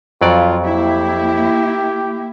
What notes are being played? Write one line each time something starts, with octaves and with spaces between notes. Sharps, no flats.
F2 F#3 F4 D5
A#3 E4 G4